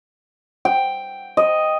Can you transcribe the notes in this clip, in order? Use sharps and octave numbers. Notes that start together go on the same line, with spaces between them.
G5
D#5